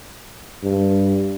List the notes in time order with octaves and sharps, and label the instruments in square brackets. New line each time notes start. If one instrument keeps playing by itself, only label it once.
[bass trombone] G2